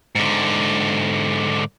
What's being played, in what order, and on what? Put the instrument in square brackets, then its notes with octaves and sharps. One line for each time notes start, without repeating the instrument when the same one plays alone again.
[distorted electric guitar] G#2 D3